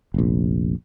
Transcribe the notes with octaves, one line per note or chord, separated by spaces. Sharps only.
F1 A#1